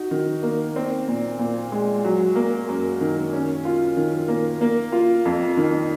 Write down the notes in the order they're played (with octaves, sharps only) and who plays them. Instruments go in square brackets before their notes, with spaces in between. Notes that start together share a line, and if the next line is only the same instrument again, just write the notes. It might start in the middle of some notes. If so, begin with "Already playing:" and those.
Already playing: [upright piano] D#4 F#4
D#3
A#3
C4
A#2
A#2
G#3
F#3
A#3
F#2
D#3
C#4
F4
D#3
A#3
A#3
F4
F2
D#3